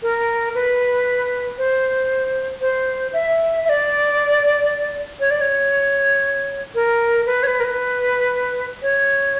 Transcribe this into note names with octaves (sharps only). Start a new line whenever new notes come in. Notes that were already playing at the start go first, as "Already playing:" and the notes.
A#4
B4
C5
C5
E5
E5
D5
C#5
D5
C#5
A#4
B4
C#5
B4
A#4
B4
C#5